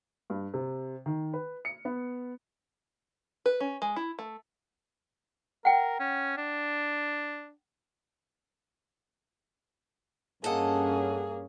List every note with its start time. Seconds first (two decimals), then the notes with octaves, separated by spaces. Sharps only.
0.30 G2
0.54 C3
1.06 D#3
1.34 B4
1.65 C#7
1.85 B3
3.46 B4
3.60 C#4
3.82 G#3
3.96 E4
4.19 A3
5.65 A#4 F#5 G5
6.00 C#4
6.37 D4
10.44 G2 A#3 C#4 G#4 A4 D#5 F#5